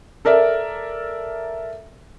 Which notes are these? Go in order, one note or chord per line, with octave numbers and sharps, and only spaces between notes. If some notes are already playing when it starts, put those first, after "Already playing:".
A4 A#4 D5 E5